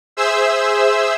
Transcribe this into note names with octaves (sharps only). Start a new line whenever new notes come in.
G#4 C5 E5 E6